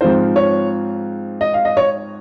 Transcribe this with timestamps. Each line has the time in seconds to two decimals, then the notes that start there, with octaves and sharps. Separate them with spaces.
0.01 G#2 F3 C4 F4 C5
0.36 C#5
1.41 D#5
1.54 F5
1.65 D#5
1.77 C#5